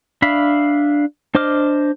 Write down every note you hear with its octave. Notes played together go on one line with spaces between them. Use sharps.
D4 E5 F5 B5
D4 C5 D#5 D6 F6